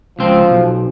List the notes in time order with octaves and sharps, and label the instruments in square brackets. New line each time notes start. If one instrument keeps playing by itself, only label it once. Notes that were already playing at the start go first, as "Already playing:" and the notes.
[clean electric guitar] C#2 C4 [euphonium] F3
[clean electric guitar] B1